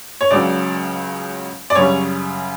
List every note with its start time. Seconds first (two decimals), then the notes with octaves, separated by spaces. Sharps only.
0.21 C#5
0.31 C#2 C#3 F#3 D5
1.70 D5
1.75 F#2 C#3 G3 C#5